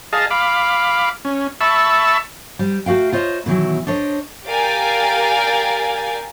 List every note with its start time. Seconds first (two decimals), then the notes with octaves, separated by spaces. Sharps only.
0.13 G#4 D#5 F5 A5
0.30 F5 B5 D6
1.25 C#4
1.61 E5 A5 B5 C#6 E6
2.59 G3 C5
2.86 A3 F#4 F5 G5
3.12 F4 C5 C#5 D#5
3.46 B2 D#3 E3 F#3
3.87 D4 C5 C#5 D#5
4.46 G4 A#4 D5 F5 G5 G#5